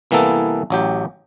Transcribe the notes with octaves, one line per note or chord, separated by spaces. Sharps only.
C2 E3 A#3 B3 A4
A1 F#3 G4